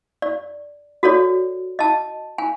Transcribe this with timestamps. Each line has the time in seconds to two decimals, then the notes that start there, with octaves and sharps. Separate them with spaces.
0.22 D5
1.03 F#4 A4 C#5 D5
1.79 D#5 A5
2.38 G#5